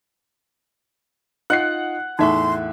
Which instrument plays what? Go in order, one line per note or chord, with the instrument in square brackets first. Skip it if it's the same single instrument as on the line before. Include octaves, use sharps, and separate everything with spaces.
[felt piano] D#4 F4 C7 [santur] F#5
[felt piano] E2 A2 E5 [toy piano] D#4 C#6 [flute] C6